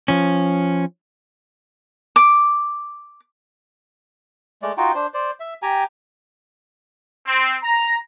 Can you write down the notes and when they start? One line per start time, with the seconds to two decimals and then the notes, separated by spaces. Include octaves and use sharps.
0.08 F3 C#4
2.16 D6
4.62 G#3 A3 D5
4.77 D#4 F4 F#4 G5
4.95 D4 C5
5.14 C5 D5
5.40 E5
5.62 G4 G5 G#5 A#5
7.27 C4
7.62 A#5